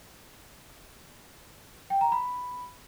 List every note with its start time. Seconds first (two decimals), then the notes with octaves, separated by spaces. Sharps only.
1.90 G5
2.01 A#5
2.12 B5